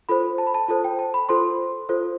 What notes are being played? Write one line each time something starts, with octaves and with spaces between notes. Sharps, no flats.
F4 A4 C5 B5
A5
B5
A5
F4 A4 C5 A5
G5
A5
B5
F4 A4 C5 C6
F4 A4 C5